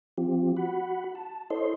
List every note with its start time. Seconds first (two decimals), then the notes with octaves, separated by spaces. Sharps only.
0.18 F3 C4 F4 G4
0.57 F#4 F#5 B5
1.15 A5
1.50 E4 A4 C5 C#5 D#5 C6